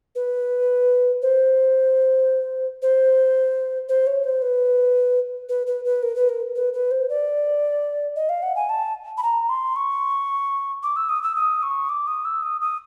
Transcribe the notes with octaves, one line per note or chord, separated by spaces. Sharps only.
B4
C5
C5
C5
C#5
C5
B4
B4
B4
B4
A#4
B4
A#4
B4
B4
C5
D5
D#5
F5
F#5
G#5
A5
B5
A#5
C6
C#6
D6
E6
D#6
E6
D#6
C#6
D6
D#6
E6
D#6
D#6